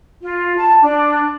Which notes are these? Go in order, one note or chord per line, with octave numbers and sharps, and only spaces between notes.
F4
A5
D4